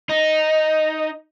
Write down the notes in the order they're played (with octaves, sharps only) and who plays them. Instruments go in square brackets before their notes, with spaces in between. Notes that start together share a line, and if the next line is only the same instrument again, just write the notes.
[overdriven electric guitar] D#4